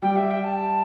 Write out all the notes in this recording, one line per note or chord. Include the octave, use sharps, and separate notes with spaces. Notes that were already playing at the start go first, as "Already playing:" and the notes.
G3 G5
E5
G5
A5